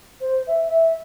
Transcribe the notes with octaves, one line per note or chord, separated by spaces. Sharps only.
C5
E5
E5